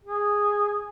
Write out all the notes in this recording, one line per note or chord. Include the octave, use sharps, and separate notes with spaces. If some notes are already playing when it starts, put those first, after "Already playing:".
G#4